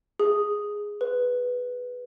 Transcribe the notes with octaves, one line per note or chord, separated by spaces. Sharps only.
G#4
B4